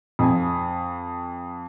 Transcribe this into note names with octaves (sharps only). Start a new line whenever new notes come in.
F2 G#5